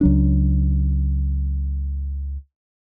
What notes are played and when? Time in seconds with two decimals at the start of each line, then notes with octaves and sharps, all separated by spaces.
0.01 C#2 F#3 D4